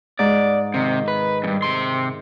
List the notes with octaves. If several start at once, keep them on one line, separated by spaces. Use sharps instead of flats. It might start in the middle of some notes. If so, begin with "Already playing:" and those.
G#2 D5
C3 D#3
B4
E2 G2
C3 C6